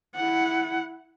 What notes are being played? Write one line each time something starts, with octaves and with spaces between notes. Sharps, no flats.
E4 F#5